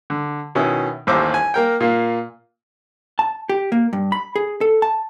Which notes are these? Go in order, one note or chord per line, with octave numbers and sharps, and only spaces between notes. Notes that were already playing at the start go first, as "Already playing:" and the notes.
D3
B2 D#3 C#4 E4
A1 D#2 C5 D6 E6
G#5
A#3 A#4 G5
A#2 A#3
A5
G4
A#3
G2
B5
G#4
A4
A5